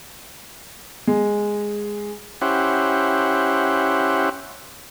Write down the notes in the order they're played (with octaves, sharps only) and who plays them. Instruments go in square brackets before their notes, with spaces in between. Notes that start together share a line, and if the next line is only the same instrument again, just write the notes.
[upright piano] G#3
[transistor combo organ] C#4 E4 G4 C5 F#5